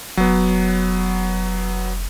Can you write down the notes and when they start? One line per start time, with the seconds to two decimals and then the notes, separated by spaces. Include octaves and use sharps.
0.17 F1 F#3 B3